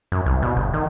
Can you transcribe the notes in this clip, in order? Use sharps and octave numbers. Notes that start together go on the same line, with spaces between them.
F#2
C2
B2
G1
D#3